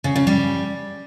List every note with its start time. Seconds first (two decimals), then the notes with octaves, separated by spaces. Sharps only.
0.04 C#3
0.16 C#3
0.27 G3